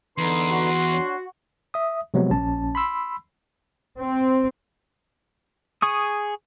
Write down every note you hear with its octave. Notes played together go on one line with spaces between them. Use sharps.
E2 D3 D#4 B4 C6
F#4
D4 C#5
E5 D#6
C3 F3 F#3 G#3 B3
A#1 C#4 A5
B5 C6 E6
C4
G#4 C#6 D#6